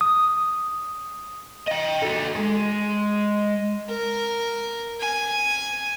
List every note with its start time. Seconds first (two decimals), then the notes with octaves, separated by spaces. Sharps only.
0.01 D#6
1.68 D#5 G5
2.02 F#4 A4
2.36 G#3
3.89 A#4
5.00 G#5